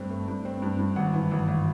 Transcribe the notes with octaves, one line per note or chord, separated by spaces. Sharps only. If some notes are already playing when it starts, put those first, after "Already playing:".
Already playing: G2 A3 C4
A3
G2
C4
G2
G2
G#1 F#5
E3
G#1
G#1